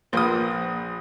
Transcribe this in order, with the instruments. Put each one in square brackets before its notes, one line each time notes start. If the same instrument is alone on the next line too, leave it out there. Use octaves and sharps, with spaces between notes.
[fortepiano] A#1 D#6 [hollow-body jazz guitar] A#3 B4 C5